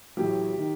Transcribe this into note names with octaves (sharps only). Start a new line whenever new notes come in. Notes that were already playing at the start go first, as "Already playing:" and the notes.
A1 A2 F#3 G4
D#3